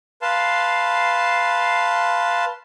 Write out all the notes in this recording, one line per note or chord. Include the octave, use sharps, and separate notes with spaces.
B4 F5 A5 C6